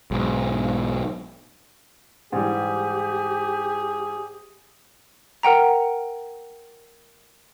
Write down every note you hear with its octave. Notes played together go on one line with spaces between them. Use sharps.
B1 G#2
G#2 E3 G3 G4 G#4
A#4 F#5 G5 A#5